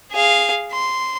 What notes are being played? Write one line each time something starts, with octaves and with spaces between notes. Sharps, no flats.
G#4 F5
C6